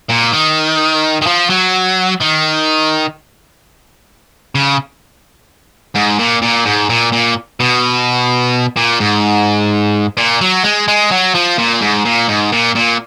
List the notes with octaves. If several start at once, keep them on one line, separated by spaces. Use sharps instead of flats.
A#2
D#3
D#3
F3
F#3
D#3
C#3
G#2
A#2
A#2
G#2
A#2
A#2
B2
A#2
G#2
A#2
F#3
G#3
G#3
F#3
F3
A#2
G#2
A#2
G#2
A#2
A#2